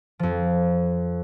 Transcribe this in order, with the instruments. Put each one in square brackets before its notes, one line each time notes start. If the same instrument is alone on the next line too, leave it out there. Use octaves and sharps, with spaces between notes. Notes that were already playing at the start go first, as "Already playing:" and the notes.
[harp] F2 F3